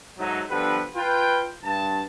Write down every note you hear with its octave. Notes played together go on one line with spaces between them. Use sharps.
G#2 F#3 A3 D#4
G1 D3 F3 G4 B4
F4 B4 G5
G2 A5